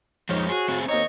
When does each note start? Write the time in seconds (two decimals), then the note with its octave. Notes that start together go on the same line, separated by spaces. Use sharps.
0.29 F2 F3 G#3 D#4 C5 C#5 F5
0.49 F#4 G#4
0.68 A3 C4 G#4
0.88 D#2 C4 D#4 C#5 D#5